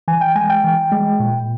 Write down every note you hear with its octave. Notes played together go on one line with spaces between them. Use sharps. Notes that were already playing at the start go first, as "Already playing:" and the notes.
E3 G#5
G5
G#3 G#5
G5
E3
G#3
A#2